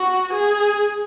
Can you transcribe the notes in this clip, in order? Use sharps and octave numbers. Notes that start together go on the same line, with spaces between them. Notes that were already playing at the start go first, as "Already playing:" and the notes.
Already playing: F#4
G#4